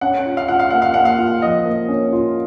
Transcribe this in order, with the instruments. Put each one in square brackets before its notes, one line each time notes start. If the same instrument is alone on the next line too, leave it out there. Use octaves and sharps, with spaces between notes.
[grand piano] C#4 [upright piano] F#5
[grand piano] F4
[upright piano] F5
[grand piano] F4 [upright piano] F#5
[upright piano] F5
[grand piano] A#3 [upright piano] F#5
[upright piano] F5
[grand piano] A#3 [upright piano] F#5
[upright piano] F5
[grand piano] F4
[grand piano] F3 [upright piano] D#5
[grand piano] A#3
C#4
F4